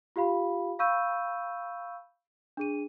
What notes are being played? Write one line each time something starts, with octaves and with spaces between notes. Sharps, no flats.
F4 G4 F5 B5
F5 B5 C#6 E6 G6 D#7
D4 G#4 D#7